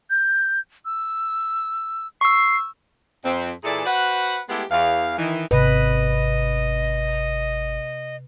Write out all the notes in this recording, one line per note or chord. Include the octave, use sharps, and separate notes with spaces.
G6
E6
C#6 E6 C7
F2 C4
A#2 E3 E4 G#4 A4 D5
F#4 B4 C5 F#5
G#3 A3 B3 E4 G4
E2 F5
D#3 E3
G#1 C3 B4 D#5